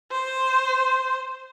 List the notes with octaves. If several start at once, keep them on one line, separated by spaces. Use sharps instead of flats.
C5